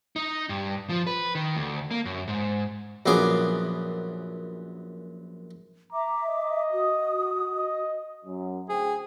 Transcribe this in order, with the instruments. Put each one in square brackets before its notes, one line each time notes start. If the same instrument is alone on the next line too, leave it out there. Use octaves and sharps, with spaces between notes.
[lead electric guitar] D#4
G2
F3
B4
D#3
D2
A#3
F#2
G#2
[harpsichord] A#1 F#2 B3 G#4 D6
[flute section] E5 D6 [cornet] A#5
[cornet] D#5
[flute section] F#4 D#6
[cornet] D#5
[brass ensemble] F#2
[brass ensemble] D2 C5 G5 [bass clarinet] G#4